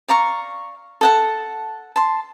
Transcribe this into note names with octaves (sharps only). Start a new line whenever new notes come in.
D5 F5 A#5 C#6
A4 F#5 A5
A5 C6